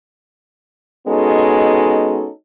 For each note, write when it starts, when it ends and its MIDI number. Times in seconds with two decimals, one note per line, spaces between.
1.07 2.29 56
1.07 2.29 59
1.07 2.29 61
1.07 2.29 63
1.07 2.29 66
1.07 2.29 69